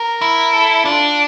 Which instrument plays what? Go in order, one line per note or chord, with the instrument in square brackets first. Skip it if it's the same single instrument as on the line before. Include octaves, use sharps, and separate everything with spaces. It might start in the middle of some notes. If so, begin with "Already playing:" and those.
Already playing: [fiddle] A#4
[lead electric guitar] E4
[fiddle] A4
[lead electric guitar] D4 [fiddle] F4